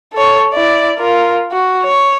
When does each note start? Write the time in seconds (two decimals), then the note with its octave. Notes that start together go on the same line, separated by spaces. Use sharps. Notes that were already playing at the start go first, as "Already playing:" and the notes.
0.13 A4 C#5
0.53 E4 D5
0.98 F4 A#4
1.52 F#4
1.83 C#5